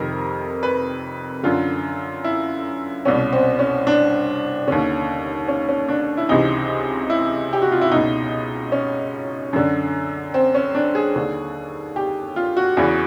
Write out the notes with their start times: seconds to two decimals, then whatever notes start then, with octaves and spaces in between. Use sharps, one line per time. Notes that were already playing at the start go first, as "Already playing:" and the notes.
Already playing: F2 C3 D#3 A#4
0.63 B4
1.43 F#2 D3 F4
2.24 E4
3.05 C2 B2 C#4
3.33 C4
3.59 C#4
3.87 D4
4.67 D#2 D3 C#4
5.48 C#4
5.69 C#4
5.89 D4
6.17 E4
6.29 C#2 C3 E3 D#4
7.10 E4
7.53 G4
7.62 F#4
7.72 F4
7.81 E4
7.91 C#2 B2 D#4
8.72 C#4
9.53 F#2 D3
10.34 C4
10.55 C#4
10.75 D4
10.95 G#4
11.15 D#2 D3
11.96 G4
12.36 F4
12.57 F#4
12.77 E2 C#3 E3